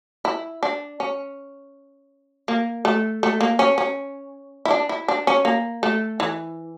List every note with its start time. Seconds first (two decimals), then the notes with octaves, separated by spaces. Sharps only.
0.25 E4
0.63 D4
1.00 C#4
2.48 A#3
2.85 A3
3.23 A3
3.41 A#3
3.59 C#4
3.78 C#4
4.65 E4
4.71 D4
4.89 E4
5.08 D4
5.27 C#4
5.45 A#3
5.83 A3
6.20 E3